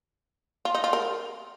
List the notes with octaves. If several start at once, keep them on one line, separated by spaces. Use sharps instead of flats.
F4
D#4
F4
A#4